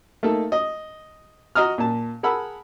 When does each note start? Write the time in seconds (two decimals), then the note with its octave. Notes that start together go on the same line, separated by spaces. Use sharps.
0.23 A3 A#3 D#4 A4
0.52 D#5
1.55 F#4 D#5 A#5 D#6 F6
1.78 A#2 A5
2.23 G#4 A#4 F#5 A5 B5 E6